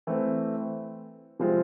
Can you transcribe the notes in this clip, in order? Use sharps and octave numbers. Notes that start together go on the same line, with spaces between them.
E3 A3 C4
C3 F3 G#3 C4 F4